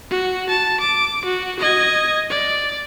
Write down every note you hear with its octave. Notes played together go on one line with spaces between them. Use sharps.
F#4
A5
D6
F#4
D#5 G#6
D5